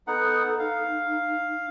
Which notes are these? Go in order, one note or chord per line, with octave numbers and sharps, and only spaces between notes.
B3 D#4 A4 F#5
D#4 F5